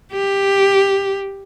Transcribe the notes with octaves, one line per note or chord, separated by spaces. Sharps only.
G4